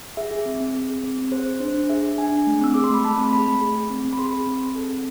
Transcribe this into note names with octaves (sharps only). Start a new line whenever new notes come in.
G#4 E5
G#4
C4
C4
G#4
G#4
C4
C4
G#4 C5
G#4
D4 C5
D4
G#4 E5
G#4
D4 G#5
D4
A3
C4 E6
G#4 D6
C6
A3 B5
A3 A5
C4
G#4 B5
A3
G#4
G#4
C4
C4
B5
G#4 C6
G#4
C4
C4
A4
C4